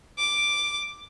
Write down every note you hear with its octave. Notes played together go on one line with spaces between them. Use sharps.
D6